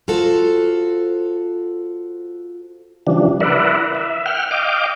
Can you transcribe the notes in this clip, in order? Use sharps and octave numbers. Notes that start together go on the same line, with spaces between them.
F4 F#4 A4 C5
C#3 E3 F3 G3 D4
E4 A#4 B4 D5 E5 F#5
E5
F#5 G5 F6
D#5 F5 G5 D6